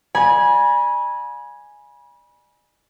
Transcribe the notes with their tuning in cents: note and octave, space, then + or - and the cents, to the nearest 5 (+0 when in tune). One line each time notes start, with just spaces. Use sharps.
D5 +40 G#5 +0 B5 -30